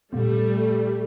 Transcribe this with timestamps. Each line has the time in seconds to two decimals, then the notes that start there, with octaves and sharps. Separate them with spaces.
0.13 A#2 G3 A3 A#3 C4